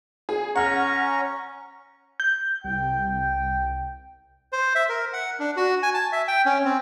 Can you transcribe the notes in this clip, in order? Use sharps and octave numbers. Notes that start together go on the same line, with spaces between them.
G#4
C#4 F#5 A#5 C#6 F6
G6
C2 G5
C5
E5
A#4
F#5
D4
F#4
G#5
A5
E5
G5
C#4
C4